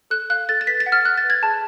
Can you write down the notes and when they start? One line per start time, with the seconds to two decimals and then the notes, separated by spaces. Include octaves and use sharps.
0.10 A4 F#6
0.30 F5 F#6
0.49 A4 A6
0.61 A6
0.67 B4 B6
0.80 A6
0.86 F#5
0.92 F6
1.04 F#5 F#6
1.18 A6
1.24 B4
1.30 G#6
1.42 G#4 A5